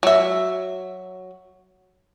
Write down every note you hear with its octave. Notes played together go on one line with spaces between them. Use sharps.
F#3 E5